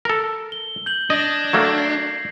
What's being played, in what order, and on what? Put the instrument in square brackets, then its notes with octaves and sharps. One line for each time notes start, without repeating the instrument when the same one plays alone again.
[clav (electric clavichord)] A4 A#4
[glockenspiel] G7
G6 F#7
[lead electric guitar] D4 [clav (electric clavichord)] D#5 [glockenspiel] G#6 A#6
[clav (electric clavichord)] F#3 A3 A#3
[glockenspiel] C7